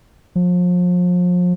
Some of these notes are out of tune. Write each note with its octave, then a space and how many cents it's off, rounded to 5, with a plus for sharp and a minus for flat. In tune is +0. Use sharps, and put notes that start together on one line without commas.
F3 +35